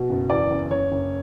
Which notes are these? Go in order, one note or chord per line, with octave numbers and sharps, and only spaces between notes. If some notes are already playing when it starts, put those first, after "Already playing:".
Already playing: B2
F#1
E2 D5
F#1
F#1 C#5
F#1